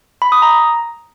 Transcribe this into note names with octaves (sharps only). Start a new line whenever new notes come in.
B5
D#6
A#5